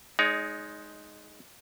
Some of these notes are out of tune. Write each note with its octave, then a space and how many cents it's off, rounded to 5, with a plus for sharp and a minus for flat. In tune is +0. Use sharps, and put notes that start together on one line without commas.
G#3 +10 D#4 +0 C#5 +40